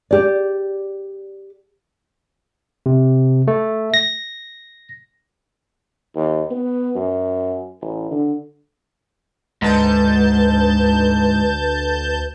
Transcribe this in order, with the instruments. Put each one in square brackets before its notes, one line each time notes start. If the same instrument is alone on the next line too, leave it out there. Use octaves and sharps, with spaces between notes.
[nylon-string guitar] G4 D5
[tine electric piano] C3
A3
A#6
[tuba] D#2
B3
F#2
A1
D3
[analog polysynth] D2 A5 G6 [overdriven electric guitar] G#2 [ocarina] B4